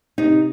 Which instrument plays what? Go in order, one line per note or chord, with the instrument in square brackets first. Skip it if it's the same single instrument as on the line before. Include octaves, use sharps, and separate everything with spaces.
[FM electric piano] C3 [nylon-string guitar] D#4